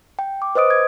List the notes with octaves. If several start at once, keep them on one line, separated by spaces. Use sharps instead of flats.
G5
D6
B4 C5 D#5 D#6 D7
G#6